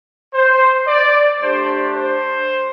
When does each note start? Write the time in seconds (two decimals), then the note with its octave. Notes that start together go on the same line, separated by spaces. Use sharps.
0.33 C5
0.87 D5
1.41 A3 D4 G4 C5
1.95 C5